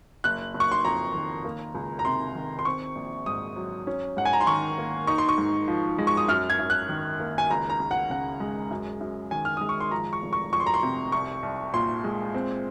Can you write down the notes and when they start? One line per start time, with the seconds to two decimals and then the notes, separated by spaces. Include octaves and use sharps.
0.24 F#1 F#6
0.54 F#1
0.60 C#6
0.72 C6
0.85 F2 A#5
1.14 D#3
1.45 A#3
1.75 C#2
1.99 A#5
2.05 C3 C6
2.35 D#3
2.59 C6
2.65 C4 C#6
2.96 A#1
3.26 G#2 D#6
3.56 F#3
3.87 C#4
4.17 G#2 F#5
4.25 G#5
4.33 A#5
4.41 C6
4.47 D#3 C#6
4.78 A#3
5.07 D#4 C#6
5.18 C6
5.29 C#6
5.38 G#2
5.68 F3
5.98 G#3
6.07 C#6
6.17 D#6
6.28 F#2 F6
6.50 G#6
6.59 F#2
6.70 F#6
6.89 D#3
7.20 A#3
7.38 G#5
7.51 C#2 A#5
7.70 A#5
7.80 C#2
7.91 F#5
8.10 C#3 F#5
8.40 G#3
8.71 F#2
9.01 F#2
9.31 D#3 G#5
9.45 F6
9.57 G#3 D#6
9.69 C#6
9.81 C6
9.91 F3 A#5
10.13 C#6
10.22 F1
10.33 C#6
10.53 F2 C#6
10.60 C6
10.66 A#5
10.74 C6
10.83 C3
11.12 C2 C#6
11.43 C2
11.74 A#2 C6
12.04 G#3
12.34 C4